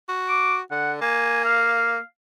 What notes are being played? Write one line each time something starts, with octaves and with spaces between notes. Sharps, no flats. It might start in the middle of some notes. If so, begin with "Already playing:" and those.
F#4
D6
D3 F#5
A#3 G#5
F5